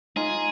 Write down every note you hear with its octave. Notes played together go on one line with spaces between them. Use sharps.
D#4 F4 G#4